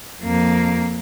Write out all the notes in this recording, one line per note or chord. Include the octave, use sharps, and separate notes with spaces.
F2 A#3